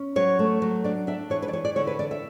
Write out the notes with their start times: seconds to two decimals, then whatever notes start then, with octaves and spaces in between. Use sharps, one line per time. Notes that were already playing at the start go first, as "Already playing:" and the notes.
Already playing: C#4
0.16 F#3 C#5
0.39 A3
0.62 F#3
0.84 D4 D5
1.07 D4 E5
1.30 E3 C#5
1.42 B4
1.48 D5
1.53 E3 C#5
1.65 D5
1.76 D3 C#5
1.87 B4
1.99 D3 D5
2.11 E5